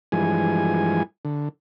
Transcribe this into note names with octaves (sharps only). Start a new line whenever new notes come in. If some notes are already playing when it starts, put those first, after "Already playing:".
G2 E3 F3 G#3 G#5
D3